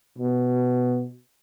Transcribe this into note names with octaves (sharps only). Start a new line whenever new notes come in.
B2